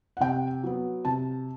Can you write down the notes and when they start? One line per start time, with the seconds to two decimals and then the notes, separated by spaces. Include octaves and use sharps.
0.17 F#5
0.20 C3 G5
0.63 F#3 B3
1.05 C3 A5